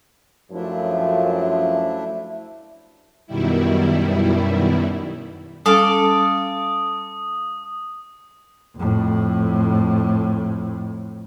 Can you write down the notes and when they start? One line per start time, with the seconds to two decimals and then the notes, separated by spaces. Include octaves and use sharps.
0.52 F#2 F3 A3 D4 E4
3.27 F#2 B2 D#3 G3 E4
5.66 G3 C#4 A4 F5 D6 D#6
8.76 F2 A2